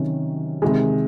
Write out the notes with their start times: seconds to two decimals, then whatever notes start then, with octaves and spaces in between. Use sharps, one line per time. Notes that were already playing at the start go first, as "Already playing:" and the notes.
Already playing: C3 D#3 F#3 C#4
0.62 C3 D#3 G#3